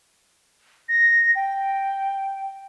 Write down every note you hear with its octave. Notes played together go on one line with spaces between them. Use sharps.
A#6
G5